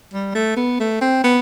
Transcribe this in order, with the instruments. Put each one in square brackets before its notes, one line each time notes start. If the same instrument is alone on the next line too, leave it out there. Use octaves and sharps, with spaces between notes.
[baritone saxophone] G3
A3
B3
A3
C4
B3